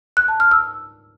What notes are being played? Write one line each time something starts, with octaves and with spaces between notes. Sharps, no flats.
F#6
A5
F6
E6